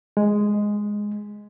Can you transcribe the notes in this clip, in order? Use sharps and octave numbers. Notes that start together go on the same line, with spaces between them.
G#3